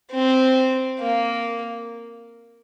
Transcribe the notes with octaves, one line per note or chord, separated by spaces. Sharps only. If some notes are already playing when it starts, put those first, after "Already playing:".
C4
A#3